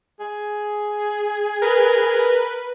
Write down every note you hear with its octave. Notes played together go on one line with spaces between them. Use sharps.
G#4
A#4 B4